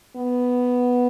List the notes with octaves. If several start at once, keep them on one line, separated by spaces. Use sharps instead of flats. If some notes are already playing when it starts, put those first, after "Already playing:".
B3